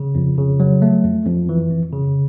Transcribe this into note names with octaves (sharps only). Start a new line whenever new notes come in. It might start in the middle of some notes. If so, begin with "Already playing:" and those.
Already playing: C#3
F2
C#3
F#3
A3
F2
F2
E3
F2
C#3